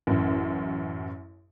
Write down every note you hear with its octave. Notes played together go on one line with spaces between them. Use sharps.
A1 F#2